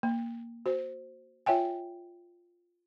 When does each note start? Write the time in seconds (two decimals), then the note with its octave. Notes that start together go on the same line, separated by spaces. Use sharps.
0.03 A#3
0.66 F#4 C5
1.46 F4 C#5 E5 G5 G#5